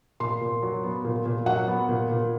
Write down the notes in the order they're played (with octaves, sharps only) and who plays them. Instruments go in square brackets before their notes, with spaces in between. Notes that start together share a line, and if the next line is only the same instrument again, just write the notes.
[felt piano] A#2 C6
A#2
F#3
B3
A#2
A#2
F#3 F#5
B3
A#2
A#2